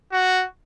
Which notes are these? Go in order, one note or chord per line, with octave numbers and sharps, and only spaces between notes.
F#4